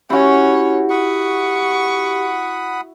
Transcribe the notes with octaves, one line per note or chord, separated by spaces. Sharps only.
C#4 E4 F#4 G4 C#5
F#5 B5 C#6 D#6